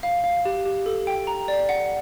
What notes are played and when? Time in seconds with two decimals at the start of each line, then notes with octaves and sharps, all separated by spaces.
0.03 F5
0.24 F5
0.45 G4
0.66 G4
0.86 A4
1.07 G5
1.27 A#5
1.48 D5
1.69 F#5